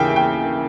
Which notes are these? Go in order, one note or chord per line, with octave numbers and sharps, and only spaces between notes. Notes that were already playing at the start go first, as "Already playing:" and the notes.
Already playing: D#2 C#3 E3 E5 G5
G5